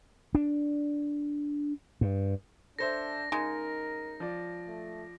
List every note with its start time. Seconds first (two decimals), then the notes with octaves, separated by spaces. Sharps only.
0.35 D4
2.01 G2
2.79 D4 A4 C5 E5 A#6
3.32 C#3 G#3 D#4 A#4
4.20 F3 D5
4.67 A3